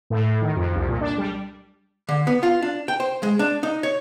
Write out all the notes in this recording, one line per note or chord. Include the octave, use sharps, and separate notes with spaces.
A2
D#3
F2
C2
A#2
D4
G3
D3
B3
F4
D4
G5
C5
G#3
D4
D#4
C#5